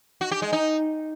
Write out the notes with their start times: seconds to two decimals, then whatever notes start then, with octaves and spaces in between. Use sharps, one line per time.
0.21 F#4
0.31 G4
0.42 G#3
0.53 D#4